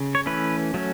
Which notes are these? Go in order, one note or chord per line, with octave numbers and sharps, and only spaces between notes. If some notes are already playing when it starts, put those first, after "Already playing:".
Already playing: C#3
C#5
E3 A3 C#4 B4
F#3 A3 C#4